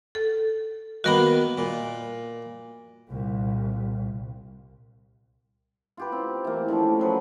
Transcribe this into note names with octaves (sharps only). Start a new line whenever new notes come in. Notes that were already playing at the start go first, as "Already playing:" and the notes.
A4
D#3 A#3 B3 F#4 A#4 B5
A#2
C2 A#2
F4 G4 B4
C4
E3 A#3
D3 F3 A3 C#4
F3 F#3 B4